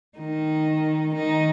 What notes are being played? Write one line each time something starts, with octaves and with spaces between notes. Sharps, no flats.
D#3 D#4
D#3 D#4